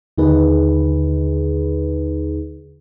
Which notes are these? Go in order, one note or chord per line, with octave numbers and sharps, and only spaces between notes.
D#2 D3 D#4 G#4 B4